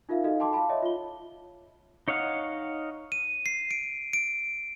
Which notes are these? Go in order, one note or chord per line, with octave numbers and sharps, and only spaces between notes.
D#4 F4 A#4 E5 F5
D#4 F#4 A4 D#5 F5
G5 A5 C6 D6
F5 A5 B5
C#5 D#5 E5
F4 G7
D#4 C#5 D#5 F5 F#5
D#7
C7
D7
D7